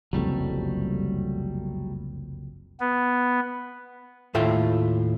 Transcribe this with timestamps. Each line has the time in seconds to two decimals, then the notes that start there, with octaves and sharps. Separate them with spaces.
0.13 F#1 C2 F2 F#3 G3 A3
2.80 B3
4.34 D#2 A2 A3 F4 E5 G5